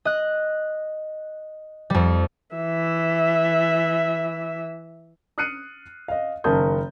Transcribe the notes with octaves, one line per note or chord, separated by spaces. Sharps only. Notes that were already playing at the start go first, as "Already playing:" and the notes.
D#5 F#6
F2 G3
E3 E5
D#6 F6 F#6 C7 C#7 D#7
D#5 F5
F#1 D#3 A#4 A5 D#6 G6